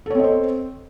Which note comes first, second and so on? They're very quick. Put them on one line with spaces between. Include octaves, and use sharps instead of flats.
A4 C#5 C4 D#5 C5